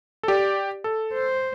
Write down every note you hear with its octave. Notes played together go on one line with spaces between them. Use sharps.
A4
G4 D5
A4
C5